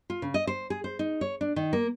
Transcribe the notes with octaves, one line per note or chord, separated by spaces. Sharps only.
F4
C#3
D#5
C5
G#4
C5
D#4
C#5
D4
D#3
A#3